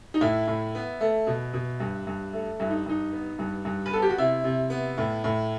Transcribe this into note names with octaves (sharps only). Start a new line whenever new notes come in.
D#4
A2 E4
A2
B3
A3
B2
B2
G2
G2
A3
G2 E4
D#4
G2 D#4
B3
G2
G2
B4
B3 A4
G4
F#4
C3 E4
C3
B3
A2
A2